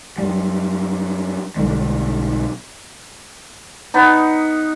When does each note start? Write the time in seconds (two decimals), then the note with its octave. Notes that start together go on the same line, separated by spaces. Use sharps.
0.18 F#2 G3
1.56 B1 D3 G3 G#3
3.94 B3 D#4